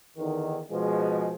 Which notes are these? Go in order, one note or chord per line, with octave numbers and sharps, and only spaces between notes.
E2 D3 D#3
B2 F3 G#3